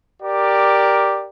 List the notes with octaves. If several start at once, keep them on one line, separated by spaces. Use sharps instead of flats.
G4 A#4 D5